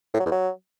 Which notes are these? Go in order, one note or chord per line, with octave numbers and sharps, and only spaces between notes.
A2
F#3
E2
F#3